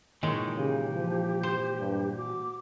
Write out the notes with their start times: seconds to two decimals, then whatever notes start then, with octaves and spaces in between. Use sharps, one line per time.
0.23 A#2 D#3 E3 G#3 C#5
0.57 C#3 G4
0.95 F3
1.43 C5
1.80 G2
2.17 F#4 D6